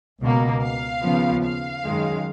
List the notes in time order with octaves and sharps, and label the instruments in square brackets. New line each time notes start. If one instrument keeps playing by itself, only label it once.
[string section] C#2 B2 A#3
F5
D#2 C#3 F3 B3
F5
F#2 D#3 G#3